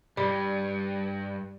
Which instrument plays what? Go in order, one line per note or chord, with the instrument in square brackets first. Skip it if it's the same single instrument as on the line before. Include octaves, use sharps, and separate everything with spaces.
[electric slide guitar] G2 [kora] G3